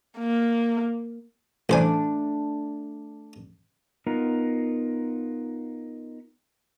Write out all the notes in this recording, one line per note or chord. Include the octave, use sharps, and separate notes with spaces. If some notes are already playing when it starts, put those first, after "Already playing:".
A#3
A1 A3 D4 C5 G#5
B3 D#4 F4 A#4